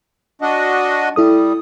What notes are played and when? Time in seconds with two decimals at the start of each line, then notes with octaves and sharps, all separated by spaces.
0.42 D4 F#4 D#5
1.16 G3 E4 A4 D#6